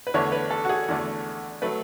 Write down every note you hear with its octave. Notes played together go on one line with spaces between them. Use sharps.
B4
E2 D3 A3 C#5
B4
A4
F#4
G#4
E2 D3 A3
F#3 A3 B4